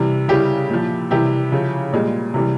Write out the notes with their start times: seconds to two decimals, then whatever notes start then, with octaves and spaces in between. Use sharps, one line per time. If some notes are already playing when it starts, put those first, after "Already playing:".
Already playing: C3 E3 G3
0.28 C#3 G3 E4 G4
0.69 A#2 F3
1.11 C3 E3 G3 E4 G4
1.52 C#3 F3
1.92 A#2 G3 G#3
2.34 C3 E3 G3